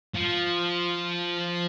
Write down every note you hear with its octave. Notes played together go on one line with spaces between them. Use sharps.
F3